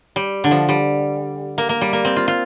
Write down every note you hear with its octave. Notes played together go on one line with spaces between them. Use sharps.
G3
D3
F3
G3
A#3
A#3
G3
A#3
C4
F4
F4